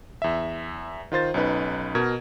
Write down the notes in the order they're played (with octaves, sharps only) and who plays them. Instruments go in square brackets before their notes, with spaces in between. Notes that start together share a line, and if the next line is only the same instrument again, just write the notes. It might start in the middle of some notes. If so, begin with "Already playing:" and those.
[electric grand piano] E2 E5
D#3 F4 C5 A6
B1 C#4 D#4 B4
B2 A#4 G#6